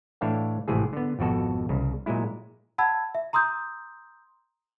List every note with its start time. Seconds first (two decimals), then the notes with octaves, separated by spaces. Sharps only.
0.21 A2 E3 D4 C#5 E5 F5
0.68 G#1 A2 C3 E3 G#4
0.93 D3 B3
1.19 G#1 F2 B2 F#4 A4
1.69 C2 C#3
2.06 A#2 F#3 G#3 E4
2.78 F#5 A5 B5 E6 G#6
3.15 E5
3.33 A#5 C6 D#6 E6 G6